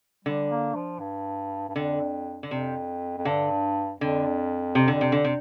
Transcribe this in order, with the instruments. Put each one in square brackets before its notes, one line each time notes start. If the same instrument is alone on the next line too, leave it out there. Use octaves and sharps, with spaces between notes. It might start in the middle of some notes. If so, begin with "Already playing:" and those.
[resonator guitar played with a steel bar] D3 [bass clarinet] G3
[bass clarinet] A#3
F3
G2
G2
[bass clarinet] F2 [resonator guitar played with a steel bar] D3
[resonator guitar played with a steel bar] D3
[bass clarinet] F2 [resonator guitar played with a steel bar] C3
[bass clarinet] F2
[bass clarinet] G2 [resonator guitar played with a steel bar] D3
[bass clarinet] F2 [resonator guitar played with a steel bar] D3
[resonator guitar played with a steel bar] C3
D3
C3
D3
C3